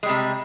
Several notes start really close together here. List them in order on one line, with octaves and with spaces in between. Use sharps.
G#3 G3 C3